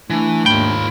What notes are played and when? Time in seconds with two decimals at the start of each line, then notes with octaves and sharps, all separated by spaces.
0.10 E3 A3 D4
0.46 D#2 G#2 F4 G5 B5